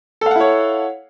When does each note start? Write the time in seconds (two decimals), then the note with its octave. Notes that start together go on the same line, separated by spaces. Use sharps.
0.21 A4
0.26 F5
0.31 F#5
0.36 E4
0.40 C#5